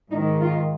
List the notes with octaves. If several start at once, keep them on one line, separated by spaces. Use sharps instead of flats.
G#2 D#3 D#4
F4